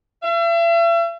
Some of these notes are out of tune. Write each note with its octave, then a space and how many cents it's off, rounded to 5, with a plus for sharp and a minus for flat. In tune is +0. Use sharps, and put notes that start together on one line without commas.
E5 +40